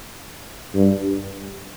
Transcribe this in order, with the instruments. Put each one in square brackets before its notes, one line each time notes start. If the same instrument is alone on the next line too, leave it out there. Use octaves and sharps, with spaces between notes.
[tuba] G2